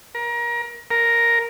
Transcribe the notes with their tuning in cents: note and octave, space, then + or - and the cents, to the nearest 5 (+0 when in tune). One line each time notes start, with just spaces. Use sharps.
A#4 +30
A#4 +5